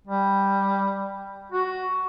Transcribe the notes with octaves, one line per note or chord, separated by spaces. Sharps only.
G3
F#4